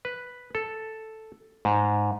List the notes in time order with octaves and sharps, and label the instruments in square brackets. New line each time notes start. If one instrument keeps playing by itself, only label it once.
[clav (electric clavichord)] B4
A4
G#2